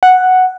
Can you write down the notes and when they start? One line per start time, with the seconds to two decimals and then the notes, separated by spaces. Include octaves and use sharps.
0.03 F#5